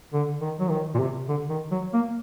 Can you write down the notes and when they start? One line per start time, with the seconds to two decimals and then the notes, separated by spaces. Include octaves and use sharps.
0.13 D3
0.41 D#3
0.60 F#3
0.70 D#3
0.94 A#2
0.99 C3
1.29 D3
1.50 D#3
1.71 F#3
1.94 A#3